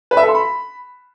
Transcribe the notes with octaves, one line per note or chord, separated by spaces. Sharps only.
B4
E5
A4
C6
B5